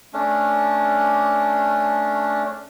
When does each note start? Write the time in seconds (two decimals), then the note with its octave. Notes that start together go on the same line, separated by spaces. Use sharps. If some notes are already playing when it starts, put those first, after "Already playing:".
0.14 A3 C#4 D4